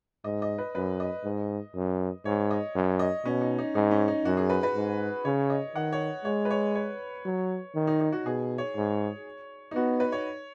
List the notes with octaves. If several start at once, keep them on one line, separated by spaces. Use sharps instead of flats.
G#2 D#5
D#5
B4
F#2 B4
D#5
G#2
F#2
G#2 C#5
D#5
F#2
D#5
B2 C#4
D#4
D#4
G#2 D#4
C#4
D#4
F#2 F#4
G#4
B4
B4
G#2
C#3 C#5
D#5
D#3 F#5
C#5
G#3 C#5
B4
C#5
C#5
F#3
D#3
D#4
D#4
F#4
B2 G#4
C#5
G#2
D#4
B3 F#4
B4
C#5